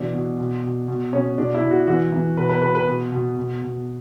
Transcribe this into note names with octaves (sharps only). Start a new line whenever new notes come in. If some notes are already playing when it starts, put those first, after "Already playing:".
Already playing: B2 E3 D4
B2
B2
B2
B2
B2 C#4
B2 D4
E4
B2
F#4
E3 F#4
E3
B2 B4
B4
B2 B4
B4
B2
B2
B2
B2